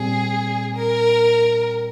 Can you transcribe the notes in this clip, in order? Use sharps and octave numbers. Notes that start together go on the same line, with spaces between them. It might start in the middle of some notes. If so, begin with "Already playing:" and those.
Already playing: A#2 G3 C4 G#4
A#4